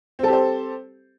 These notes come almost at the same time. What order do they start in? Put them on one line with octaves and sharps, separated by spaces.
C4 A4 G4 C5